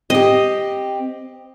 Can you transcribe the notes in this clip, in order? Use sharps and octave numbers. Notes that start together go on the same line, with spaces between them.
C4 G4 D#5